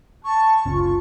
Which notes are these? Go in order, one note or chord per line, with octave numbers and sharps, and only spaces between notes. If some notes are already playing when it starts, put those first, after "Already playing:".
A5 C#6
F#1 C#2 C#4 F4